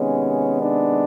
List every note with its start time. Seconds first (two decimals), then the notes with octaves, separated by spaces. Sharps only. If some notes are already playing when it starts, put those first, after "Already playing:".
Already playing: C3 D#3 G#3 B3 C#4
0.60 D4